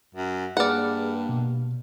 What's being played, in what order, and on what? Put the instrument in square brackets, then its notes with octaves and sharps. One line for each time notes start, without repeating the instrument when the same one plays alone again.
[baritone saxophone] F#2
[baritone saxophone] G2 [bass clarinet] A#3 [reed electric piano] G#4 B4 F6 [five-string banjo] D5 F#5
[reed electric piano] B2